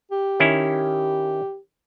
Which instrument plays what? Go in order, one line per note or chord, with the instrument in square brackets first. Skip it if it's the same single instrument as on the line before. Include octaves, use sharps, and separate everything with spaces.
[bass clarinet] G4
[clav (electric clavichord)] D#3 C#4 E4